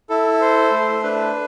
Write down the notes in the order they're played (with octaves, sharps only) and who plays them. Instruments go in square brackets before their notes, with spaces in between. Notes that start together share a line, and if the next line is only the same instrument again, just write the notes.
[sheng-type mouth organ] E4 [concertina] A4
[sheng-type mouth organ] C5
A3
[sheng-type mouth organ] D4 [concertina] B4